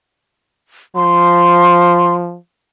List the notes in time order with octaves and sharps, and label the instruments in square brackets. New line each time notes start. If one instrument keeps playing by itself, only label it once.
[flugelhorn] F3 [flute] C6